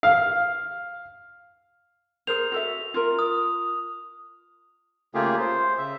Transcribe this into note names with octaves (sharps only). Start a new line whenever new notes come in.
F5
G#4 A#4 C5 F7
F#4 A4 E5
F4 A#4
D#6
C#3 A3 A#3 F4 G4 G#4
C5
C#3 E5